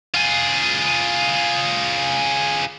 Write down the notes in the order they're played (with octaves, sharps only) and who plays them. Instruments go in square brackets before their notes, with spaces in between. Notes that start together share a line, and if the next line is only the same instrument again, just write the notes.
[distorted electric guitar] F4 G#4